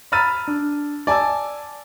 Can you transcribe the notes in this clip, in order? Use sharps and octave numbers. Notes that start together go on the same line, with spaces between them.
A#5 B5 E6 F6 A6 D#7
D4
D5 G#5 A5 D6 E6